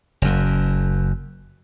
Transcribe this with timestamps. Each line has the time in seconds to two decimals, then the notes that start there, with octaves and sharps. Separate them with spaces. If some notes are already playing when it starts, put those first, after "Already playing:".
0.22 F#1 F#2